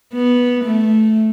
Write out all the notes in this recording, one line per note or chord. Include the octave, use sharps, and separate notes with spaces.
B3
A3